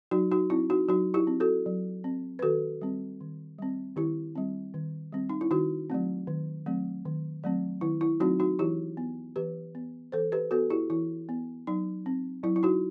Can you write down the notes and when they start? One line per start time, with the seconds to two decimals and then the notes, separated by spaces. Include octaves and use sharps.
0.11 F#3 D#4 F#4
0.32 D#4 F#4
0.50 C4 E4
0.70 D#4 F#4
0.88 F#3 D#4 F#4
1.14 E4 G4
1.27 C4
1.40 F#4 A4
1.66 F#3
2.04 C4
2.39 B4
2.42 D#3 F#4 A4
2.82 G3 C4
3.21 D#3
3.59 G3 C4
3.96 D#3 E4 G4
4.35 G3 C4
4.74 D#3
5.12 G3 C4
5.29 D#4
5.41 E4
5.51 D#3 D#4 F#4
5.90 F#3 A3 C4
6.27 D#3
6.66 F#3 A3 C4
7.05 D#3
7.44 F#3 A3 C4
7.81 D#3 E4
8.01 E4
8.20 F#3 A3 C4 D#4 F#4
8.40 D#4 F#4
8.59 E3 E4 G4
8.97 B3
9.36 E3 G4 B4
9.75 B3
10.12 E3 A4 C5
10.32 G4 B4
10.51 B3 F#4 A4
10.70 E4 G4
10.90 E3 E4
11.29 B3
11.67 F#3 D#4
12.06 C4
12.44 F#3 E4
12.56 E4
12.63 D#4 F#4